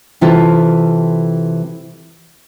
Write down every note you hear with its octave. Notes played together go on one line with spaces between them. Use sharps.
C3 E3 E4 F4 A4